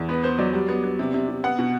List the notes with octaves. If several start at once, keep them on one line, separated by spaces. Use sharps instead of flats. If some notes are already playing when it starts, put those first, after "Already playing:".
Already playing: E2
B3 B4
B3 C5
F#3 D5
G3
B3
B3
C3
C3
C3
B3 F#5
B2